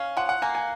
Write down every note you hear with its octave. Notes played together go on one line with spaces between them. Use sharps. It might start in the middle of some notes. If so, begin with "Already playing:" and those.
Already playing: C#4 F5
F3 F#5
F#5
A#3 G#5
G#5